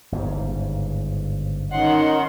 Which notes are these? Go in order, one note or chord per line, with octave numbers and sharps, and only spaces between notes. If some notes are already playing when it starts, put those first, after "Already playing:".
G1 G#2 C#3
D#3 C#4 D#4 F#5 C6